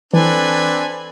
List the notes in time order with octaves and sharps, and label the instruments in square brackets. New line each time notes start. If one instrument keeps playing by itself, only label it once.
[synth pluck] E3 [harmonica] C4 D4 B4 [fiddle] A4 G#5